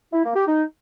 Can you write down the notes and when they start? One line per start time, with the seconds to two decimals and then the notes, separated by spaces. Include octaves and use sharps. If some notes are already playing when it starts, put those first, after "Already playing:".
0.13 E4
0.24 A#3
0.35 G4
0.47 D#4